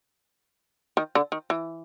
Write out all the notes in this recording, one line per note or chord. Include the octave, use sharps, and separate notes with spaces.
D#3
D3
D#3
E3